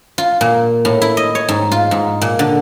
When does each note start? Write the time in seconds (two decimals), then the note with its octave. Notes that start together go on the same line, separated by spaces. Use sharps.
0.18 F4
0.41 A#2
0.85 A2
1.02 E4
1.17 D#5
1.35 C#5
1.49 G#2
1.72 F4
1.91 G#2
2.21 A#2
2.39 D3